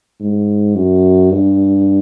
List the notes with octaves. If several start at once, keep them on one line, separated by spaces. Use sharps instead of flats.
G#2
F#2
G2